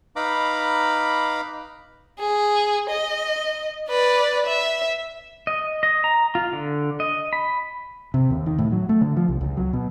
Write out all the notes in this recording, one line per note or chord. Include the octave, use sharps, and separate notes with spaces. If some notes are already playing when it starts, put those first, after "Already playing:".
D#4 B4 F5 A#5 B5 D6
G#4
D#5
B4 D5
E5
D#5
D#5
A#5
F4
D3
D#5
B5
C3
D#2
D#3
A2
F#3
A3
D3
F3
C2
C#2
F#3
B2